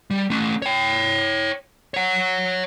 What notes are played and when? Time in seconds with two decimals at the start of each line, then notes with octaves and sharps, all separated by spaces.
0.10 G3
0.30 A3 C#4
0.62 C#5 G5
1.94 C#5 F#5